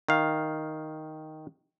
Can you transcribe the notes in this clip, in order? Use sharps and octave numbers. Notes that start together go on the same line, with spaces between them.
D#3 F5